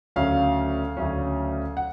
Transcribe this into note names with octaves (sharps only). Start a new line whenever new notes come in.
D2 C#3 F#3 C#4 F5
D2 C#3 F#3 C#4
F#5